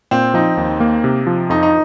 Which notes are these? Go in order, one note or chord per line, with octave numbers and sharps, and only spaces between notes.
A#2 C4
F3 D#4
D#2
A#3
C3
F3
F2 D#4
D#4